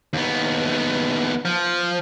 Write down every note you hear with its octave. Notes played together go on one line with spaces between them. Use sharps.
D#2 B3
F3